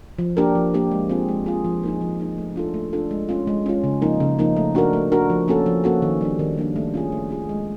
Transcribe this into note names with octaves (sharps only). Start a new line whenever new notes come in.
F3
A#3 D4 G4 A#4
F3
A#3 D4 G4 A#4
G#3
C4 F4 G#4
G#3
C4 F4 G#4
F3
A#3 D#4 G#4
F3
A#3 D#4 G#4
A3
D4 F4 A4
A3
D4 F4 A4
G#3
C#4 F4
G#3
C#4 F4
C#3
F3 A#3 D#4
C#3
F3 A#3 D#4
A3
D4 F#4 A#4
A3
D4 F#4 A#4
F3
A#3 C#4 F#4 A4
F3
A#3 C#4 F#4 A4
D#3
G3 A#3 D4
D#3
G3 A#3 D4
A3
C#4 F4 G#4
A3
C#4 F4 G#4
G#3